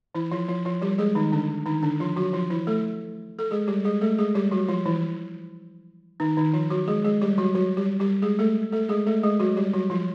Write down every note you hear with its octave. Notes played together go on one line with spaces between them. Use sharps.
E3 E4
F3 F4
F3 F4
F3 F4
G3 G4
G#3 G#4
D#3 D#4
D3 D4
D#3 D#4
D3 D4
F3 F4
F#3 F#4
F3 F4
E3 E4
A3 A4
A4
G#3 G#4
G3 G4
G#3 G#4
A3 A4
G#3 G#4
G3 G4
F#3 F#4
F3 F4
E3 E4
D#3 D#4
D#3 D#4
F3 F4
F#3 F#4
G#3 G#4
G#3 G#4
G3 G4
F#3 F#4
F#3 F#4
G3 G4
G3 G4
G#3 G#4
A3 A4
A3 A4
G#3 G#4
A3 A4
G#3 G#4
F#3 F#4
G3 G4
F#3 F#4
F3 F4